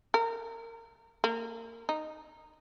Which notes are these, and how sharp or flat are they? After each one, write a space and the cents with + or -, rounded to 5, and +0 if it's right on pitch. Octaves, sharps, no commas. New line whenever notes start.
A#4 -25
A#3 -25
D#4 -10